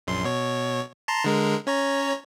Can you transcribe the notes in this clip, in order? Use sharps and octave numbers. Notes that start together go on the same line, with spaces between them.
A#1 F#2 C6
B2 C#5
A5 A#5 C6
D3 G#3 A#4
C#4 C#5 A#5